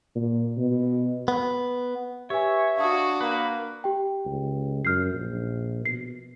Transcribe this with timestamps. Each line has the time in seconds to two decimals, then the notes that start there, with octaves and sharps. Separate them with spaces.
0.15 A#2
0.57 B2
1.28 B3
2.30 G4 B4 C#5 E5 G#5
2.77 D4 F#4 F5 D#6
3.21 A#3 B4
3.84 G4 G5
4.26 C#2
4.85 F#2 F6 G6 C7
5.14 A#1
5.85 B2 C7